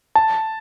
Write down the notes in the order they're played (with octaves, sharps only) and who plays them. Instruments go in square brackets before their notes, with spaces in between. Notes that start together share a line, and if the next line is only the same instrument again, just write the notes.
[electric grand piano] A5